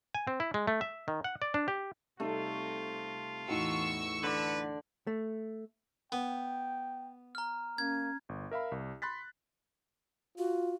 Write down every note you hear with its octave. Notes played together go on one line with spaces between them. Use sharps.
G#5
C4
E4
G#3
A3
E5
D#3
F#5
D5
D4
G4
C3 G3 A3 D#4 F4 A4
E2 A2 D#4 F#4 C#6 E6
D3 B4 D5
A3
B3 G5
A#5 F6
A#3 C#4 G#6
G1
A#4 E5 F5 B5
C2
B5 C6 F#6 A6 B6
F4 F#4